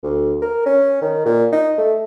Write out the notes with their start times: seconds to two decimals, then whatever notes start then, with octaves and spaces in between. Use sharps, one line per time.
0.03 D2
0.42 A#4
0.66 C#4
1.02 D#3
1.25 A#2
1.52 D#4
1.78 A3